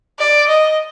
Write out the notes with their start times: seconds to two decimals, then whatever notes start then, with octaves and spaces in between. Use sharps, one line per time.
0.19 D5
0.48 D#5